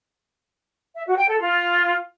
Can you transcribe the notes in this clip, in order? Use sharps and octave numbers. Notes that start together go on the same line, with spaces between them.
E5
F#4
G5
A4
F4